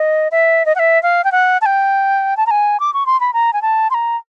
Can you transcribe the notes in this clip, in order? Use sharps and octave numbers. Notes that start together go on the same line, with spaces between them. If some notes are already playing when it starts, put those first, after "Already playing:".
Already playing: D#5
E5
D#5
F#5
E5
F5
G5
F#5
A5
G5
A5
A#5
G#5
D6
C#6
C6
B5
A#5
G#5
A5
C6
A#5